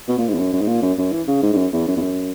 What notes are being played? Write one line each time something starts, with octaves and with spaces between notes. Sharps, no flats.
B2
A#2
G#2
E2
F#2
F#2
G#2
A#2
F#2
F#2
E3
C#3
G#2
G#2
F#2
E2
F#2
E2
F#2